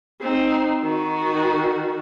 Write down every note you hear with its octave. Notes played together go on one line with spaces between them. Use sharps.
C4 D#4
D#3 F#4